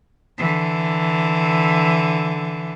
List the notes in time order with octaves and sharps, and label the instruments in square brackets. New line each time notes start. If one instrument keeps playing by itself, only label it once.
[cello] D3 E3